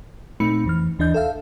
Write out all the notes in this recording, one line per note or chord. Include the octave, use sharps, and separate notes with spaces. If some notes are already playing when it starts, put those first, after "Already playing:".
A#2 A3 C4 D#4 B5 C#7
F2 E3 F6
D#2 E3 D4 D#5 G6
A4 E5 F5